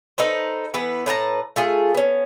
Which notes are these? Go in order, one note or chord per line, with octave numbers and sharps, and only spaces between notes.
D#4 A4 B4 C5
E3 B3 B4
A2 B4 A5 A#5
A3 F4 G#4
B3 C#4